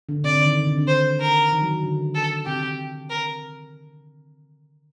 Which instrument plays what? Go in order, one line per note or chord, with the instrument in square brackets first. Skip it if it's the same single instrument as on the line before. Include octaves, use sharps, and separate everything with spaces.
[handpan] D3
[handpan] C3 [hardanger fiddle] D5
[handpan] D3
D#3
D3
C3
D3
[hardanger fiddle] C5
A#4
[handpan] D#3
F#3
D#3
D3
[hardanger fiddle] A4
[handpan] C3 [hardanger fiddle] G4
[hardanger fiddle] A#4